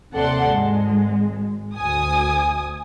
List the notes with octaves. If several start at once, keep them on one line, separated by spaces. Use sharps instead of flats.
D#2 C3 A4 D5 F#5 C6
G#1 G#3
D2 G#5 D#6